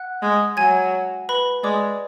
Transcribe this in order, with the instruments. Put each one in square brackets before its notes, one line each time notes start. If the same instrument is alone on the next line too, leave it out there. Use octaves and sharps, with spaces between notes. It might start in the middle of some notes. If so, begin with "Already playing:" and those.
Already playing: [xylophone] F#5 F#6
[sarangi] G#3
[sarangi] F#3 [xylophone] G#5 G#6
[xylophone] B4 B5
[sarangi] G#3 [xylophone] D5 D6